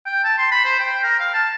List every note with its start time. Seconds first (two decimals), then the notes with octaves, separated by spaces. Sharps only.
0.06 G5
0.24 A5
0.38 C6
0.51 B5
0.65 C5
0.79 G5
1.03 A#4
1.20 F5
1.34 A5